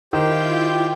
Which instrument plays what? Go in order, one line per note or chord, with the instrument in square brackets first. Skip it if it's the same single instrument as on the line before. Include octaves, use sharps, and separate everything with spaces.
[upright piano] D#3 [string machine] E4 F4 G6 [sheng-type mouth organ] G4 C5 G5